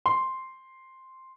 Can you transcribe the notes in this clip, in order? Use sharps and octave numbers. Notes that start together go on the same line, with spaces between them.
C6